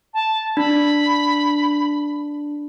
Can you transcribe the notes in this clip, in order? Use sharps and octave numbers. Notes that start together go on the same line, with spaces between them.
A5
D4 B5